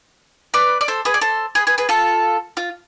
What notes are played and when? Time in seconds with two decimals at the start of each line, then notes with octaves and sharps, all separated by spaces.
0.54 B4 D5
0.81 D5
0.88 A4 C5
1.05 G#4 B4
1.14 D5
1.21 A4 C5
1.55 G#4 B4
1.67 G#4 B4
1.78 G#4 B4
1.89 F4 A4
2.57 F4